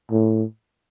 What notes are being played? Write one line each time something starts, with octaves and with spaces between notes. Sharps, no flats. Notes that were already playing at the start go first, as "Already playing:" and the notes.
A2